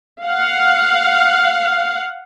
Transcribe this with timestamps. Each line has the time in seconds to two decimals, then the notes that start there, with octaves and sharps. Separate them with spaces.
0.23 F5 F#5